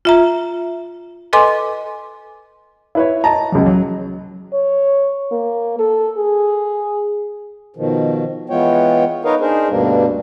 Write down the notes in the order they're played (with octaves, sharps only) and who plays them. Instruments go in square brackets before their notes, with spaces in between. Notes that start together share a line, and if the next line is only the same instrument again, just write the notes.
[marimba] F4 E5 A#5
A4 B4 D#5 G#5 C6 D6
[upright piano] E4 B4 C#5
D#5 A5 A#5
C#2 F#3
F#3
[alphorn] C#5
A#3
A4
G#4
[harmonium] B2 D#3 F3
E3 G#3 B3 F4 C#5 G5
D#4 A#4 B4 C#5 D#5 F5
D4 D#4 G#4 A#4 C5
D2 G2 B2 G3 A#3 D4